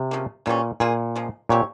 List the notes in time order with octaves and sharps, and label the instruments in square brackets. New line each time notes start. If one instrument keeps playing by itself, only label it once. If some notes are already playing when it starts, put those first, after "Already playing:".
Already playing: [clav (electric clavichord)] C3
[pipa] C#3 F3 A#3
[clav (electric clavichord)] A#2 [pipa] C#3 E3 G3 C#4
[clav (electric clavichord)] A#2 [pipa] A#3 F4 G#4
[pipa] C#3 F3 G#3
[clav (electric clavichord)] A#2 [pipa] C4 G4 C#5